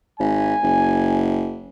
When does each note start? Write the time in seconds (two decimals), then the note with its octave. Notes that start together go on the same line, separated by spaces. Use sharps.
0.20 G#1 G#5
0.63 F#1